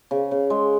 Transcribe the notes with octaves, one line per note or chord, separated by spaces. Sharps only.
C#3
C#3
G#3